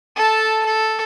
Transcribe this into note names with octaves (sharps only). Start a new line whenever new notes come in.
A4 A5
A4